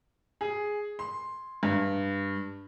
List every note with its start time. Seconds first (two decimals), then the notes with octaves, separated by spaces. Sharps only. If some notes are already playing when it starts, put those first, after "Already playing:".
0.41 G#4
0.99 C6
1.63 G2